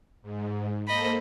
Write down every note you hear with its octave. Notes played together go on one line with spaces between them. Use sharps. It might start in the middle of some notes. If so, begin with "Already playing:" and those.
G#2
A#3 A4 C5 D#5 B5